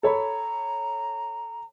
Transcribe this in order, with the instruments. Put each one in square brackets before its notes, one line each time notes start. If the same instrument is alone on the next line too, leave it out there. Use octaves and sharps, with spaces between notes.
[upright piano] A4 C#5 B5 [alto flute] A#5